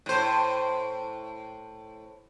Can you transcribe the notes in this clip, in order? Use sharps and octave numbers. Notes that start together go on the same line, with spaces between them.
A2 C5